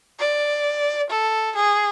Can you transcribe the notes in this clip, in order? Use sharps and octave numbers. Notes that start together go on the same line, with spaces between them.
D5
A4
G#4